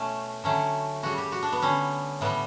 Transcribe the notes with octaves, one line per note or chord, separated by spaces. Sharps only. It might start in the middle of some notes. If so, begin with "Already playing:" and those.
Already playing: B2 A3 C#4
D3 F#3 A3 C#4
C#3 G3 F#4
G4
F#4
D4
B3
D3 G3 C#4
A2 G3 B3